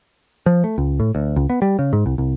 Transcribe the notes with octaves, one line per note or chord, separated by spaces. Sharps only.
F3
A3
C#2
A2
D2
C#2
B3
G3
C#3
G#2
C2
C2